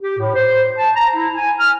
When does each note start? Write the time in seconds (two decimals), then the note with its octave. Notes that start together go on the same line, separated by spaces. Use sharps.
0.02 G4
0.19 A2
0.34 C5
0.78 A5
0.95 A#5
1.15 E4
1.36 G#5
1.59 F6